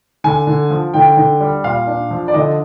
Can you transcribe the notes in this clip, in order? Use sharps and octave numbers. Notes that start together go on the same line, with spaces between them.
D3 G#5
D3
F3
D3 G5
D3
G3
A#2 F5
D4
F3
D5
D3 D#5